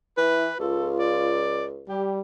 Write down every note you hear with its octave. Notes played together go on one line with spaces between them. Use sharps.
E3 E4 B4
C#2 F4 A4
D5
G3 G4